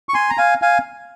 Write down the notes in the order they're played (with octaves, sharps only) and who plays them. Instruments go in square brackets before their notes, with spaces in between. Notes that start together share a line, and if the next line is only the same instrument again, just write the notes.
[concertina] C#6
G#5 C6
A#5
F5 G#5
F5 G#5